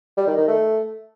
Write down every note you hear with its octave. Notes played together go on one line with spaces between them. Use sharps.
G3
D#3
D#3
A3